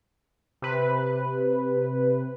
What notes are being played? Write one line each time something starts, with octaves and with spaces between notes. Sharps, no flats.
C3 B4